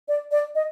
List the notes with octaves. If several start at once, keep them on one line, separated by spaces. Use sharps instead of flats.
D5
D5
D#5